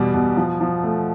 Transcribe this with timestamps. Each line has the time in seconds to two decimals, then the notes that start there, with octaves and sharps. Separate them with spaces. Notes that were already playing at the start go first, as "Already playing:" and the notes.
Already playing: E2 B2 G3
0.14 B2
0.36 F3
0.60 F3
0.83 A3